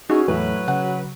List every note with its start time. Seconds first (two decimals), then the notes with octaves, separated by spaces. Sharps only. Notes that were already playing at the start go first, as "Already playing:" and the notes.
0.10 C#4 D#4 E4 F#4 G#4
0.28 E2 A2 F#3 B4
0.68 C#3 F#5